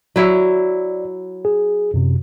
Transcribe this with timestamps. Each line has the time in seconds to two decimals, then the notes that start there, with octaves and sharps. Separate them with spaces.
0.16 F#3 E4 D5
1.45 G#4
1.94 F#2 C3